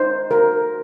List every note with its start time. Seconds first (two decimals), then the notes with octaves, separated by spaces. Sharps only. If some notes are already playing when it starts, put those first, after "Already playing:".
Already playing: D#4 C5
0.31 F#4 A#4